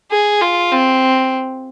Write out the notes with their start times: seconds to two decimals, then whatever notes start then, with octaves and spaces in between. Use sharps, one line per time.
0.11 G#4
0.41 F4
0.72 C4